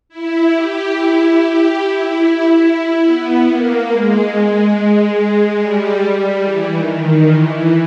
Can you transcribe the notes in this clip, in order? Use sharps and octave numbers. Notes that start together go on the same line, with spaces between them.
E4
G4
E4
G4
E4
B3
A#3
G#3
G3
G3
E3
D#3
D#3
E3